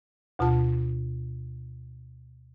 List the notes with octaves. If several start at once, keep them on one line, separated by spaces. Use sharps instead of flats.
D2 B2 F4 A5